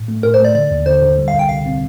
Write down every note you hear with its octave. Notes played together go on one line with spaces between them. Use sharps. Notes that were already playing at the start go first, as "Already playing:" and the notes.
Already playing: A2
A3
A2 A#4
C5
A3 D5
D3 D5
D#2
D3 C5
D3
G3
F5
C2
G5
C3 F5
C4